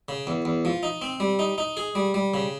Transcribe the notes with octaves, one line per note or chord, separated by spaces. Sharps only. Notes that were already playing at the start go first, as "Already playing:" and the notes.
C#3
E2
E2
F3
D#4
C4
G3
D#4
D#4
G#4
G3
G3
C#3